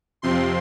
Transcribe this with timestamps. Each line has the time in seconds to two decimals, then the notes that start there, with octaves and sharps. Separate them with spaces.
0.22 F2 C3 F3 C4 C6